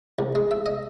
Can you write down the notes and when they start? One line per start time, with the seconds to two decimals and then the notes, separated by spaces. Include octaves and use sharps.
0.19 C2
0.35 G#3
0.51 E5
0.66 D#5